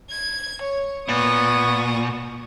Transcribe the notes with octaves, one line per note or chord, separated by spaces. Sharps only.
G#6
C#5
A#2 B3 C#6 D#6